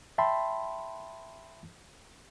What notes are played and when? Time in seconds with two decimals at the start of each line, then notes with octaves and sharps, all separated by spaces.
0.18 E5 G5 A5 B5 C6